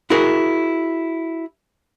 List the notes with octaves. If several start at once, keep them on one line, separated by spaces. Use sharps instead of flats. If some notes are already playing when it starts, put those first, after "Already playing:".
E4 F#4 G#4 A#4